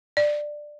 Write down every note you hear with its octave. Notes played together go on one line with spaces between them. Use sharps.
D5